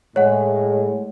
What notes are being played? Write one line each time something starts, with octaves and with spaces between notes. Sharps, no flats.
A2 G#3 C#5 F#5